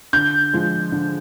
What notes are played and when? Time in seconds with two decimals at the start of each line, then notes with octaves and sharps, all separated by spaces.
0.13 D3 G6
0.53 F3 G#3
0.92 D3